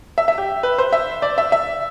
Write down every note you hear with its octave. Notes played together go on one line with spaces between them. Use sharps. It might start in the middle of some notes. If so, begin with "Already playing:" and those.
E5
E5
G4
B4
C5
E5
D5
E5
E5